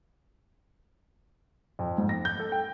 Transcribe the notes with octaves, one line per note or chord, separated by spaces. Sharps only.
F2
G#2
A#6
G6
A4
G5